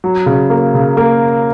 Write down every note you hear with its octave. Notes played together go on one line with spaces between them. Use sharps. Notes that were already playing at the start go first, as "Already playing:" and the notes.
F#3
C#3
A#3
C#3
A#3